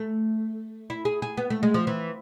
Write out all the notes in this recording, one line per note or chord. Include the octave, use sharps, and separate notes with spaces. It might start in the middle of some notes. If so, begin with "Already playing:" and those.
Already playing: A3
E4
G#4
G#4
B3
A3
G#3
F3
E3